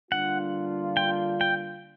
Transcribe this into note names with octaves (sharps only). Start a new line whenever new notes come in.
D3 G3 A#3 D4 F4 F#5
G5
G5